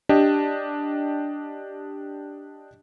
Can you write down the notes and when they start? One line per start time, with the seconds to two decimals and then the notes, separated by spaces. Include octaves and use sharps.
0.09 D4 G4 D#5